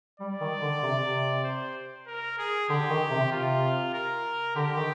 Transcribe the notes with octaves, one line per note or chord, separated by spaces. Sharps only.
G3 D5
D#3
D3
C3
C3
C5
A#4
G#4
D3 G4
D#3
C3
C3 F4
A#4
D3 G4
D#3